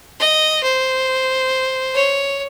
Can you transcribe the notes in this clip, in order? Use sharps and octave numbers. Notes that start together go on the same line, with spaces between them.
D#5
C5
C#5